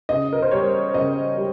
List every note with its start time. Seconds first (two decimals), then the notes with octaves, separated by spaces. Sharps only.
0.09 C#3 D#5
0.33 A#4
0.42 C5
0.52 G3 C#5
0.94 C#3 D#5
1.38 G3